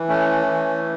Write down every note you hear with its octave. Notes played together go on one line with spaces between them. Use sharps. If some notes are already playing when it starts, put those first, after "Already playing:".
Already playing: E3
A3 C#4
E3